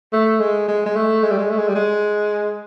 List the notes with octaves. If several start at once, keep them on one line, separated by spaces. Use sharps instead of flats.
A3
G#3
G#3
G#3
A3
G#3
G3
G#3
A3
G#3
G3
G#3